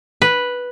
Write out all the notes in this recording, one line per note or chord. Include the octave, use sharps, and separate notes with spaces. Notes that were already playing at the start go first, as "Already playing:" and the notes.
B4